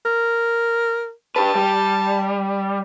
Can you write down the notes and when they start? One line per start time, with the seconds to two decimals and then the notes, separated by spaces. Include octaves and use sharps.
0.06 A#4
1.36 G4 B4 A5
1.55 G3